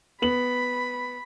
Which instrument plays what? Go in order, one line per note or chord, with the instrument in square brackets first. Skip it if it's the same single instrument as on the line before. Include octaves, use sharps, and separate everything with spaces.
[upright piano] B3 F#7 [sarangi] B5